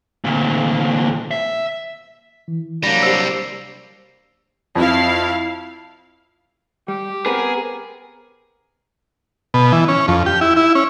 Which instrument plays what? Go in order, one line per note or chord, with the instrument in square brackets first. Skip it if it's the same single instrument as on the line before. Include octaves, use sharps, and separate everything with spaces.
[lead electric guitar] D2 A#2
E5
[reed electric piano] E3
[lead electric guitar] C2 G3 [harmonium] F#3 A#3 D4 [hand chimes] A#6
[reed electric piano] G4 C5 [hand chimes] E6 C7
[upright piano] F2 [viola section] E4 F5
[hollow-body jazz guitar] G3 [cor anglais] G4
[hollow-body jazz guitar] B3 C4 B4 [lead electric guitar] G#4 [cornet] A#4
[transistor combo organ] B2
E3
C#4
F2
G4
E4
E4
C#4